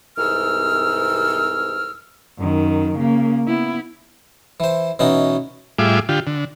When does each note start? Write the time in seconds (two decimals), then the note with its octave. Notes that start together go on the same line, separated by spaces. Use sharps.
0.18 C2 G#2 C3 E3 E6 F6
2.38 F#2 D#3
2.97 C#3 A#3
3.47 B3 E4
4.60 E3 C5
4.99 B2 E3 C#4 D#4 F#4
5.79 A2 G3 F4 G#4 E5 D6
6.09 D3 F4 G4
6.27 D3